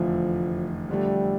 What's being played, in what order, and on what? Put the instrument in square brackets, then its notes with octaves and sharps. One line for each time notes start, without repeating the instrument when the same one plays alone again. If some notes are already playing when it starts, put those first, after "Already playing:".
Already playing: [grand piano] F1 E2 D3 A3 [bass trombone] F3
[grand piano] F2 D3 A3 [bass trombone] G3